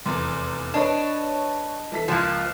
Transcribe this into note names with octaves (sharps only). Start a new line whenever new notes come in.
F1 E2 C6
D4 B4 C#5 D#5 A5
E3 A4 B6
C#2 F3 A#3 F#6